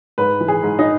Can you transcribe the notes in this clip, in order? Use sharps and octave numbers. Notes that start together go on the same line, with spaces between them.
G#2 B4
E3
G#4
G#2
D#4